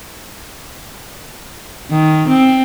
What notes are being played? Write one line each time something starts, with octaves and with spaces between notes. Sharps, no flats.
D#3
C4